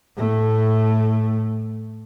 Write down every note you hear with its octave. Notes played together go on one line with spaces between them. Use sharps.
A2 A3